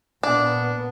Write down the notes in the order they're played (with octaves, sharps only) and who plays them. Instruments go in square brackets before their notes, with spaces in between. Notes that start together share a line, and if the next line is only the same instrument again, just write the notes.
[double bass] A#2 B3 [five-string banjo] D4